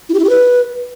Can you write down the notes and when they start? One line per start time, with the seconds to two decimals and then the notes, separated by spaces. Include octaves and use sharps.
0.09 E4
0.14 G4
0.19 E4
0.24 G4
0.29 B4